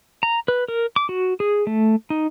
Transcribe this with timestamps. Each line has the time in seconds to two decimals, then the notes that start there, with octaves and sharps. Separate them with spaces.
0.23 A#5
0.48 B4
0.68 A#4
0.96 D6
1.09 F#4
1.40 G#4
1.67 A3
2.10 D#4